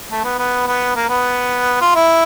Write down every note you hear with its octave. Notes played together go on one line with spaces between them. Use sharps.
A3
B3
B3
B3
A#3
B3
F4
E4